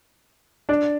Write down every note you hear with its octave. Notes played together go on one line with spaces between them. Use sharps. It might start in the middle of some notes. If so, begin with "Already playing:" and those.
D4 D5